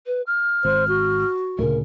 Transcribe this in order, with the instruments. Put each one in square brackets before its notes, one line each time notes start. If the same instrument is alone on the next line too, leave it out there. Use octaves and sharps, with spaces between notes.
[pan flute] B4
F6
[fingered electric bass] G#1 [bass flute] C5
[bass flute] F#4
[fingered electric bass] D2 A#2 C#3 [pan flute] A#4